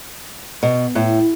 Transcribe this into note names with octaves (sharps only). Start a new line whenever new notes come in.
B2
A2